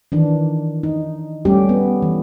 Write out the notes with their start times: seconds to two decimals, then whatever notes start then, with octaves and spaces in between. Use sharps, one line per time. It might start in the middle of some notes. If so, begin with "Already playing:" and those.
0.12 D#3 E3 D4
0.83 D#4
1.45 G3 A3 C#4 G4
1.69 B3
2.02 E3